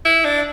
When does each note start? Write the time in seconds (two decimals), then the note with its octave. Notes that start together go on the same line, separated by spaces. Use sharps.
0.05 E4
0.24 D4